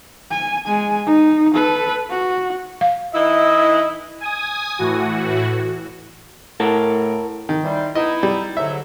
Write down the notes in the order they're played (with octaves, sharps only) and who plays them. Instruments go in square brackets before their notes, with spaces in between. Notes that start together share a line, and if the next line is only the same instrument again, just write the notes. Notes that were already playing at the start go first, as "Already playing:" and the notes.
[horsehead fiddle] G#5
G#3 G#5
D#4
A4 B4
F#4
[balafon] F5
[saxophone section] E3 D#4 E4 [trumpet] D#5
[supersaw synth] G#5 D#6
A2 E3 F#4
[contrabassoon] A2 [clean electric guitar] A#4 F#5 A5
[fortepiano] D#3
[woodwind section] E3 G3 C5
[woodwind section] B3 D#4 E4 [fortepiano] D#5
[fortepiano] G3
[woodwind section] G#2 D3 F#3 [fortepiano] E5